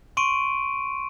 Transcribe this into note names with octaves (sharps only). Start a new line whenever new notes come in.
C6 C#6 D7 D#7